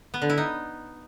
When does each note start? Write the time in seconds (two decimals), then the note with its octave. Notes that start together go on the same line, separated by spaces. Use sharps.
0.14 B3
0.22 D3
0.30 E4
0.37 D#4